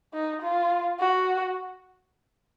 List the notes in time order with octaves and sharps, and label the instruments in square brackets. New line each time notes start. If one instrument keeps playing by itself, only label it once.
[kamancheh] D#4
F4
F#4